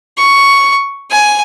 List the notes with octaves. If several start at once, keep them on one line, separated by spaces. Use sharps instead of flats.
C#6
G#5